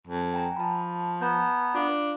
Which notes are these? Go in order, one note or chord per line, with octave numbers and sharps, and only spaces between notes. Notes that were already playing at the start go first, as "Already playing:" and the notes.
F2
G5 G#5 A#5
F3 A5 B5
B3 A5 A#5 G6
D4 F4 F5